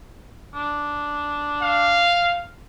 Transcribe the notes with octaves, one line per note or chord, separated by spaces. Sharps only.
D4
F5